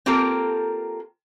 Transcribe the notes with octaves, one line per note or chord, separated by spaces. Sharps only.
A#3 C4 F4 G4 A4 A#4